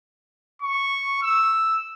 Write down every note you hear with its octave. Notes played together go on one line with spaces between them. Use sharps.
C#6
E6